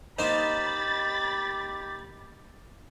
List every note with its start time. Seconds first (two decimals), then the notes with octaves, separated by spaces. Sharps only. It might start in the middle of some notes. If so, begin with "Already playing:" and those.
0.19 A#3 D#4 G4 C5 B5 A6